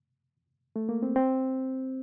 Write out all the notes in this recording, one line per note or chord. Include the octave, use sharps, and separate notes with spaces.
A3
A#3
C4
C4